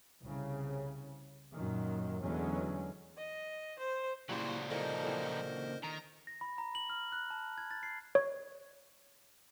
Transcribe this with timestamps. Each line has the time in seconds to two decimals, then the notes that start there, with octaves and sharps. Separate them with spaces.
0.22 C2 C#3
1.54 F#2 A#2 D#3
2.24 E2 D3 F#3 G#3 C#4
3.17 D#5
3.79 C5
4.29 A#2 C#3 F#3 G3 A#3 E4 C5
4.70 D3 E3 F3 D#4 A#4 C5 D#5
5.04 D3 E3 C4
5.84 D#3 A#5
6.27 A#6
6.41 B5
6.58 A#5
6.75 F#7
6.90 F6
7.12 F#6
7.30 A5
7.58 G#6
7.71 A6
7.83 C7
8.15 C#5